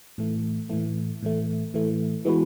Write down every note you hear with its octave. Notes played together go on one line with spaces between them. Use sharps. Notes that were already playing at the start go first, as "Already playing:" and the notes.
A2 E3 A3
A2 E3 A3
A2 E3 A3
A2 E3 A3
E3 G#3 B3 F#4 B4